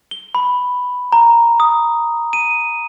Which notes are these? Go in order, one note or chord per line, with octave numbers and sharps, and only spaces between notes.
G7
B5
A#5
D#6
D#7